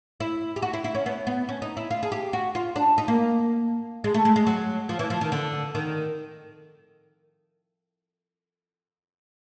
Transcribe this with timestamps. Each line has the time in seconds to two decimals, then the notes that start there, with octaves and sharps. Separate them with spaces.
0.20 E4
0.56 G4
0.62 F#4
0.73 E4
0.84 E4
0.95 C#4
1.06 B3
1.27 B3
1.49 C#4
1.62 D#4
1.77 E4
1.91 F4
2.03 G#4
2.12 G4
2.33 F#4
2.55 F4
2.76 D4
2.98 D#4
3.08 A#3
4.04 G#3
4.14 A3
4.25 G#3
4.36 G#3
4.47 F#3
4.89 F3
4.99 E3
5.10 F3
5.21 D#3
5.32 D3
5.75 D#3